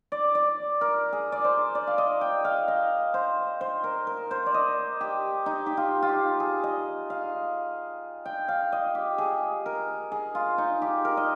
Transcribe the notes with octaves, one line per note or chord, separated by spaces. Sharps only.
D5
D5
A#4
G#4
D5
C5
D5
F5
D#5
G5
F5
D#5
C5
C5
A#4
A#4
C5
D5
D#5
G4
D#4
G4
F4
F4
G4
G#4
D#5
F5
G5
F5
D#5
G4
G#4
A#4
G#4
F4
D#4
G4
A#4
D#5